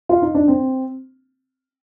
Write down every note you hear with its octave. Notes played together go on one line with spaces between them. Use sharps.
F4
D#4
D4
C4